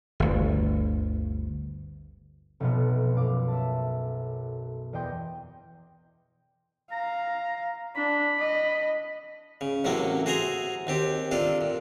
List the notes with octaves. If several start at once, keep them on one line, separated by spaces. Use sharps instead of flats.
G1 D2
F1 B1 B2 B3 F4 F6
F#2 F5 D6
E5 A5
E2 D5 D#5 G5 C6
F5 A#5
D4 B5
D#5
C#3
A1 A2 C3 F#3 A#3 A4
F#4 G#4 C5 E5 A#5
D#2 C4 G4
C3 D4 F4 A4
A#2